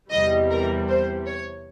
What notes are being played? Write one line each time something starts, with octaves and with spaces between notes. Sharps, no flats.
E2 C3 E3 G3 D#5
A#4
C5
C#5